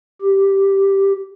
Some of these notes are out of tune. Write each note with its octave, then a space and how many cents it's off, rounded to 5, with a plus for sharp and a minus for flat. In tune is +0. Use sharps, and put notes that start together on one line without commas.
G4 +0